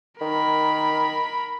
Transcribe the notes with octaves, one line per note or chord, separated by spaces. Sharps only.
D#3 A#4 B5